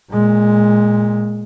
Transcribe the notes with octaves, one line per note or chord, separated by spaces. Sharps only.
A#2 G#3